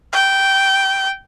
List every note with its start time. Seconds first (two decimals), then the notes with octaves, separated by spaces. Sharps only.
0.13 G5